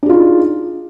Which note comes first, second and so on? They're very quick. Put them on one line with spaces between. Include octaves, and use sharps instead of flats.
D4 G#4 F4 D#4